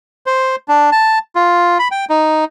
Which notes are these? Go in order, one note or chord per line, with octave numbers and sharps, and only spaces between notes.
C5
D4
A5
F4
B5
G5
D#4